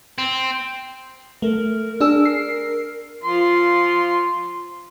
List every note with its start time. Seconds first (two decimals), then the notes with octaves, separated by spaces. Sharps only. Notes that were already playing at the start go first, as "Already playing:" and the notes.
0.18 C4
1.42 A3 A#4
2.01 D4 G#4 E6
2.26 C7
3.23 F3 C6